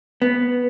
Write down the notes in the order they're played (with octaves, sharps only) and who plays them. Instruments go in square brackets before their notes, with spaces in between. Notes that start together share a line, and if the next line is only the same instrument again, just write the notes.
[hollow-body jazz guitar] B3